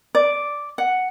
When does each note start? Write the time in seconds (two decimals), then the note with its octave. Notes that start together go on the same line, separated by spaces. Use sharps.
0.15 D5
0.78 F#5